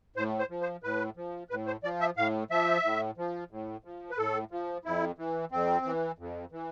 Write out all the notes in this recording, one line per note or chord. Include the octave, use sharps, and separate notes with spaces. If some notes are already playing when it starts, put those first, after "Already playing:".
A2 C5
C5
F3
C5
A2 B4
F3
A2 B4
C5
F3 D5
E5
A2 F5
F3 E5
A2
F3
A2
F3
B4
A2 A4
F3
F2 E4
E3
F2 C4
E3
F2
E3